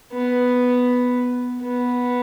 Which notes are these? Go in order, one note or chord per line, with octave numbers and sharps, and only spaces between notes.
B3
B3